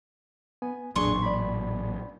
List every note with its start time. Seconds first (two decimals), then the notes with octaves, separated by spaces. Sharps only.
0.62 B3 G#5
0.96 A1 E2 A#2 F#3 D4 G#4 C6 C#6
1.22 D5 B5